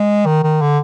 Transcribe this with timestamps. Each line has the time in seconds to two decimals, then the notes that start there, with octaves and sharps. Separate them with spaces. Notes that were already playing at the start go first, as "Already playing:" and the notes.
Already playing: G#3
0.26 D#3
0.43 D#3
0.61 D3